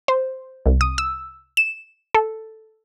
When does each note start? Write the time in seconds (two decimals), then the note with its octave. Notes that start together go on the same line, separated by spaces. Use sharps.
0.08 C5
0.66 C2
0.81 D#6
0.98 E6
1.57 E7
2.15 A4